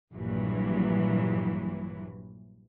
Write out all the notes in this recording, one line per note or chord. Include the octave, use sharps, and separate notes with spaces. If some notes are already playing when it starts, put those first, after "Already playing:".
A#1 G2 E3 F#3